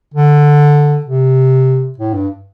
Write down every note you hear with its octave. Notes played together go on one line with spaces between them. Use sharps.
D3
C3
A2
G2